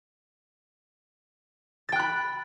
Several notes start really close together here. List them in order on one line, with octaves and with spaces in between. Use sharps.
A6 G5 F#6 B5